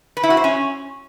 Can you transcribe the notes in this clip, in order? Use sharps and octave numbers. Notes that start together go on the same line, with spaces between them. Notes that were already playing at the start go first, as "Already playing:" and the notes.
B4
E4
F#4
C5
C#4